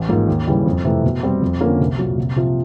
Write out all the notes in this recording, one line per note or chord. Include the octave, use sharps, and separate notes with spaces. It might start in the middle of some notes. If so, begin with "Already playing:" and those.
Already playing: A1
G#2 F3 A#3
D#2
C#3 E3 G3
F2
C3 E3 A3
B2
G3 C4
F2
D3 F3 A#3 C#4
C2
A#2 F#3
C2
C3 F3